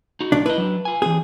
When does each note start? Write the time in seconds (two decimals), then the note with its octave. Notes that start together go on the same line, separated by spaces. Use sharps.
0.21 D#4 F#4
0.32 B1 D4
0.46 E4 B4 D#5
0.58 F#3 D4
0.85 F4 G#5
1.02 E3 C4 G#4